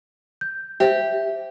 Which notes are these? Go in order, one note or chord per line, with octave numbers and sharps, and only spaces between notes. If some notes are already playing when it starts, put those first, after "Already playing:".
G6
G4 C5 E5